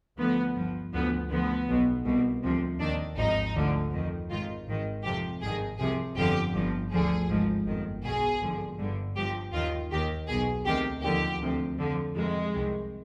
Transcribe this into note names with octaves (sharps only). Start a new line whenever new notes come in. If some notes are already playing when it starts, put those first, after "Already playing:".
D2 D3 F3 B3
G1 G2 F3
D2 D3 F3 B3
D2 D3 F3 B3
B1 B2
C2 B2
D2 C3 F3
D#2 D#3 D4
G#1 G2 F3 D#4
D2 D3 F3
F2 D#3
G#1 G#2 D#3 F4
G#1 G#2 D#3
F2 C3 F3 G4
G#1 G2 D#3 G#4
C2 C3 F3 G#4
G1 F2 D3 F3 G4
G1 G2 F3
D2 D3 F3 G#4
G#1 G#2 F3
G1 F2 D#3
B1 B2 G#4
G#1 G2 D3 F3
G1 G2 D3
G1 G2 F3 G4
D#2 D#3 F4
D#2 D#3 G4
B1 B2 G#4
D2 C3 D#3 G4
D#2 D3 F3 G4
D2 C3 F3
F2 D3 F3
F2 C3 D#3 G#3
C2 C3 D#3